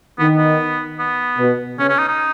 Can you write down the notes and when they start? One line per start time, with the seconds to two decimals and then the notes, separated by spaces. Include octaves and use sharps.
0.19 D#3 B3
0.37 B3
0.99 B3
1.38 B2
1.78 C#3 C#4
1.89 C#4
1.98 D#4
2.08 D#4